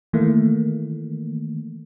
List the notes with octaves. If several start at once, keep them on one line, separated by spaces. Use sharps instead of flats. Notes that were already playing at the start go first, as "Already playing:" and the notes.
D#3 E3 A3 A#3